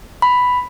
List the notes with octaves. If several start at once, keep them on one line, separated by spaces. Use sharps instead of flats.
B5